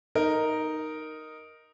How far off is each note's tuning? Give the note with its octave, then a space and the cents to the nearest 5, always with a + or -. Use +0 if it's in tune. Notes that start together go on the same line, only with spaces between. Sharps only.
D#4 +0 A#4 +0